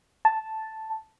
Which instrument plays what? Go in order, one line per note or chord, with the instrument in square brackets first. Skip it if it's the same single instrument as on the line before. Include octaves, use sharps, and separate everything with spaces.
[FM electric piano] A5